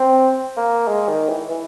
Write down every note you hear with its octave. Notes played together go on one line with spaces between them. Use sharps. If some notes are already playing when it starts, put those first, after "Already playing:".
Already playing: C4
A#3
G#3
D#3
E3
E3